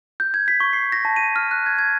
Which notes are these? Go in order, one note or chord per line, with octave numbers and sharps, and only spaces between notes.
G6
G#6
B6
C#6
C7
A#6
A5
D#7
F6
F#6
G#6
G#6